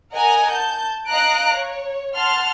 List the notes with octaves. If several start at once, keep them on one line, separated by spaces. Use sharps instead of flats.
A#4 D#5 F#5 G#5 A#5
A5 G6
D#5 F5 A#5 F#6 D7
C#5
F#5 A5 C6 F6